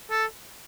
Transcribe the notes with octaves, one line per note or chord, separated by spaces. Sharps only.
A4